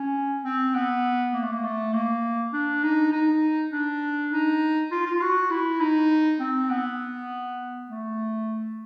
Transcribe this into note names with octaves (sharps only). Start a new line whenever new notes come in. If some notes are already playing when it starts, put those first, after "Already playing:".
Already playing: C#4
C4
B3
A#3
A3
A#3
A3
A#3
D4
D#4
D#4
D4
D#4
F4
F4
F#4
E4
D#4
C4
B3
A3